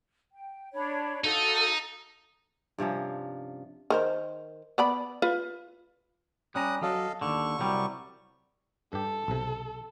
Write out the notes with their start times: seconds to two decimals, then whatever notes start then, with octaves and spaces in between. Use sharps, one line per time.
0.33 G5
0.74 D4 C#5 B5
1.24 D#4 F#4 A4 F5
2.78 G2 C3 F3 C#4
3.90 D#3 A#4 C5
4.78 B3 D5 B5
5.22 F4 B4
6.55 G3 C#4 A#5 D#6 F#6
6.82 F#3 A4 D#5 F5
7.21 D#2 D3 C#6
7.60 C2 F#3 G3
8.93 G2 G4 A4
9.28 B1 C3